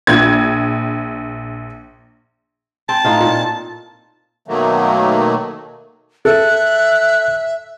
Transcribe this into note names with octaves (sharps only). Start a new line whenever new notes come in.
A#1 G#6
C4 A5
A2 D#4 F4
A#2
B2 D#3 F#3 A3 A#3
A4 E5 F#6